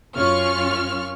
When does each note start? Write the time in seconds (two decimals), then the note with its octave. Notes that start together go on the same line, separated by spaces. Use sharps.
0.16 F#2 C#4 F4 C#6 F6